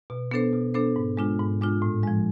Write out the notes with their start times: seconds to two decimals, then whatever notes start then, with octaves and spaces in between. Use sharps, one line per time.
0.10 B2
0.31 B3 D4 A4 C5
0.53 B2
0.74 B3 D4 A4 C5
0.96 G#2
1.17 G#3 D4 F4
1.39 G#2
1.61 G#3 D4 F4
1.82 A2
2.03 F3 G#3